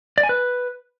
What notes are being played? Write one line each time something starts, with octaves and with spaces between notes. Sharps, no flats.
D5
G#5
B4